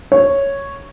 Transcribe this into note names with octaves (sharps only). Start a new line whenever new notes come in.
C#5